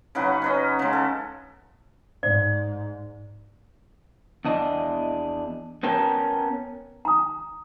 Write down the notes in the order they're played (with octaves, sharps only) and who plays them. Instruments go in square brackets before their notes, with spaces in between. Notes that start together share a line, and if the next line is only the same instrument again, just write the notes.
[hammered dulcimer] C#3 F#3 D#4 B4
C#4 B4 D#5
C#3 G#3
A4
[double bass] G#2 [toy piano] D5
[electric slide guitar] E2 D4 D#5
B3 C#4 A#4 G5 A5
[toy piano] A#5 D#6